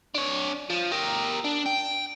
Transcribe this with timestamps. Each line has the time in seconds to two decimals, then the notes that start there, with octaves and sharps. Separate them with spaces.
0.15 D4 C#5
0.70 F3
0.92 G4 A#4
1.44 D4
1.66 G5